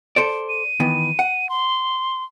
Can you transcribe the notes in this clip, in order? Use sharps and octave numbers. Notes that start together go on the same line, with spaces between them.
A4 C5 D5
D#7
D#3 E3 B3
F#5
C6